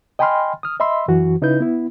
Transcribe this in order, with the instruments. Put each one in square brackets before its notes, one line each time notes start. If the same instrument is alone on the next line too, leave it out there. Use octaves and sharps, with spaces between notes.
[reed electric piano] D#5 G5 G#5 B5 C6 F6
D#6 F6
D#5 E5 B5 C6 E6
F#2 E3 F#4
C#3 D#4 E4 B4 G6
B3 E4